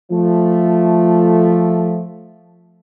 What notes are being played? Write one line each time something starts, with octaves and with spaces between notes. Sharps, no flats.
F3 A3